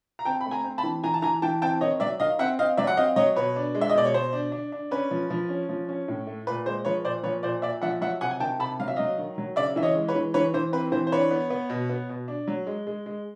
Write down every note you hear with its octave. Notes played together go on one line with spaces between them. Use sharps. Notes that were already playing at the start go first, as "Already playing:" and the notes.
A#5
C4 G5 A5
B5
A3
G#5 A#5
C4
A5 B5
E3
E3 G#5 A#5
A5
E3 G#5 A#5
E3 G5 A5
C4 G5 A5
D#3 C#5 D#5
F#3 D5 E5
D#3 D#5 F5
C4 E5 F#5
C4 D#5 F5
F#3 D5 E5
F#5
C4 D#5 F5
F#3 C#5 D#5
B2 B4 C#5
D4
G#3
E5
D#5
B2 D5
C#5
B2 C5
D4
D4
D4
C#4 B4
F3
F3
C#4
F3
C#4
A2
A3
A#2 B4
G#3 C5
F3 B4 C#5
A#2 C5 D5
F3 B4 C#5
A#2 C5 D5
A#2 D5 E5
F3 E5 F#5
F#3 E5 F#5
C3 F#5 G#5
G#5
D#3 G5 A5
C3 A5 B5
F#3 F5
E5
F#3 D#5 F5
D#3
F#3
C#3 D5 E5
E3 E5
C#5 D#5
G#3
B4 C#5
E3
E3 B4 C#5
E3 C5
C4 B4
E3 C5
C5
D4 B4 C#5
B3
B3
B2
B3
B2
D4
F#3
G#3
G#3
G#3